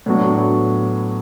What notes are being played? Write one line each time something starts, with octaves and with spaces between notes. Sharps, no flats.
A2 F#3 B3 D4 F#4